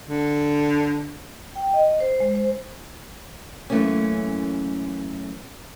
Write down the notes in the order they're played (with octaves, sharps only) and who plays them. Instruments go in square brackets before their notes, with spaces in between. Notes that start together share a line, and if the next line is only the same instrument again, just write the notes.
[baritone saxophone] D3
[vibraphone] G5
D#5
C5
G#3
C5
[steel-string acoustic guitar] F#2 E3 A3 A#3 C#4